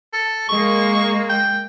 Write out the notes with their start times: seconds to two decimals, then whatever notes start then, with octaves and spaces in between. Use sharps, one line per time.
0.14 A4
0.49 G#3 A#3 C#6
1.30 G5